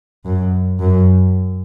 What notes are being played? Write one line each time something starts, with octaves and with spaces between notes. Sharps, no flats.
F#2
F#2